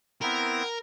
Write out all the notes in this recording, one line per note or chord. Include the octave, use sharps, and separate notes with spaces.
B3 C4 E4 A#4